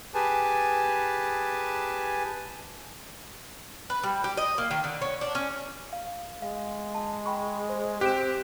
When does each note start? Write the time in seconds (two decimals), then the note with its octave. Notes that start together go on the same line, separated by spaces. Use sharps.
0.15 G4 G#4 B4 G#5 A5
3.90 B4
4.03 G3
4.24 G4
4.37 D#5
4.58 A#3
4.71 D#3
4.84 D3
5.01 C#4
5.21 D4
5.35 C#4
5.93 F5
6.42 G#3 F5
6.95 A5
7.26 G5 B5 C#6
7.69 C5
8.01 C4 G4 F#6 D7 E7